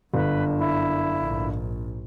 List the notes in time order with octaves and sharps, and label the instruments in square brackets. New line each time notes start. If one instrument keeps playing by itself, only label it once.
[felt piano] G1 [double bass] F#2 D4 [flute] B4
[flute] E4
[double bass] A#1 G#2